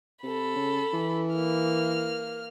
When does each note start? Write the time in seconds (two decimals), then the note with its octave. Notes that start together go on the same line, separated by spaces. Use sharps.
0.23 C3 A4 B5
0.56 C#3
0.93 E3
1.34 A#3 F6